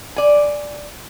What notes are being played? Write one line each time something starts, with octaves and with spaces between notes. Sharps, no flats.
D5 G#5